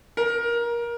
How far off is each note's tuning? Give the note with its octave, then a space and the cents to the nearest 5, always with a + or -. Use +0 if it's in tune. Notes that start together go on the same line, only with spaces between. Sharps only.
A#4 +20